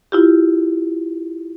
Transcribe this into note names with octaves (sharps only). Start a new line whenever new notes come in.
E4 F4 G4